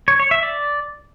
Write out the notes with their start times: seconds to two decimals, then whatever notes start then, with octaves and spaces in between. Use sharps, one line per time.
0.08 C#5
0.20 C#5
0.31 E5
0.43 D5